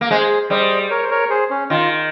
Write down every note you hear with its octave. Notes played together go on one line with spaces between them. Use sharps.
A#3
G#3 G#4 C5
G3 C5 D#5
A#4 C#5
C5
A#4 C#5
G#4 C5
C#4
D#3 F4